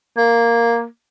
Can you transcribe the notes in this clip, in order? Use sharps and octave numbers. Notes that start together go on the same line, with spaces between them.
A#3